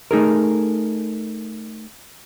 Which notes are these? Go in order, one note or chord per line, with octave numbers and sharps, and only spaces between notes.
A3 D#4 G#4 A#4